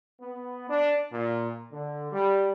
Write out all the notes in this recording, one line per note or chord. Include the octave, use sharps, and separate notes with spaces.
B3
D4
A#2
D3
G3